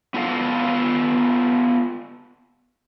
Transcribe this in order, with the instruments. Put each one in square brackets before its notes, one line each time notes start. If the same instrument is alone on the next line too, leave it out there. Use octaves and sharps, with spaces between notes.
[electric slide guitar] B3 F4 A4 F5